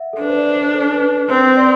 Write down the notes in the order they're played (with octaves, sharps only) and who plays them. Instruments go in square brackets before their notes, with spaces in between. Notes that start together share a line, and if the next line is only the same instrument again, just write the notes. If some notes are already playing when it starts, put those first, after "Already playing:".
Already playing: [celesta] E5 F#5
A4
[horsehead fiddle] D4 [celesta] B4
[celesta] C5
D5
C5
A4
B4
[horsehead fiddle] C4 [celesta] C5
[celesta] D5